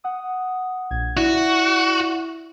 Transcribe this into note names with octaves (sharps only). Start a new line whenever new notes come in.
F#5 D#6
A#1 G#6
E4 F#4 D5 E5